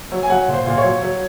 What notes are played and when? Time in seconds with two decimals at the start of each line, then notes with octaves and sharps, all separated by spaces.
0.12 F#3
0.23 G#5
0.30 F#3 F#5
0.48 A#2
0.54 C5
0.66 A#2
0.78 C#5
0.84 F#3
1.02 F#3